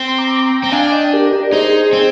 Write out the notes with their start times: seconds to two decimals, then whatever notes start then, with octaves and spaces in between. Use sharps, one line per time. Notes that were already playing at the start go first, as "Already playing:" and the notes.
Already playing: C4
0.08 C6
0.18 A#5 D6
0.46 G5 A#5
0.63 C4
0.72 D4 F5 G#5
0.92 D#5 G5
1.13 G4 A#4
1.32 G4 A#4
1.43 D5
1.52 D#4 G#4 C5
1.93 C4